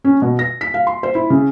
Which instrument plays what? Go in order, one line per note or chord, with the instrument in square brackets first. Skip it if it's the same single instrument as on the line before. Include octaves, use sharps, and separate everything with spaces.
[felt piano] C#4
B2
A#6
B6
F5
C6
C5
E4
C#3